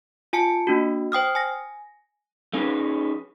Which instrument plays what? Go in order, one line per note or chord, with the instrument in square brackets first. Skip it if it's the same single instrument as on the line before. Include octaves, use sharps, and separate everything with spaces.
[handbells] F4 G#5 A5 C#7
A#3 D4 F#4
C5 G5 D#6 F6
G#5 A#6
[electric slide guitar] A3 C#4 D#4 G#4 B4